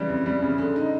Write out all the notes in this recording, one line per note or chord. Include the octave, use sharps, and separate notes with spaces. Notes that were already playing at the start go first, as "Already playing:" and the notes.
Already playing: C#3 E3 G3
F2
G3
C#3
D3
D#4